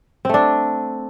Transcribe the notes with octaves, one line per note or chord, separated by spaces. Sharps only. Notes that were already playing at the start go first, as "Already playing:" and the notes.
A3 C4 D4